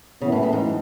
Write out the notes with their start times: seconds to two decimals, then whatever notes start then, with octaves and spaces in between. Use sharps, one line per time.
0.21 F#2 C#3 E3 B3
0.32 A2
0.43 A2
0.53 G#2